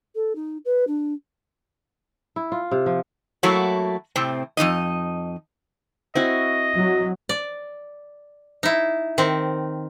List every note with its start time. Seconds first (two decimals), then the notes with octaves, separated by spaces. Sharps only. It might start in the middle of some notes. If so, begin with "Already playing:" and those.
0.15 A4
0.35 D#4
0.65 B4
0.87 D4
2.36 E4
2.52 F4
2.71 C3
2.86 F3
3.43 F#3 A3 A#3 E4 F#4 C#5
4.16 A2 C3 C4
4.57 F2 E3 D#4 D#5
6.15 C4 E4 F#4 D#5
6.74 F#3
7.29 D5
8.63 D#4 E4
9.18 D#3 C4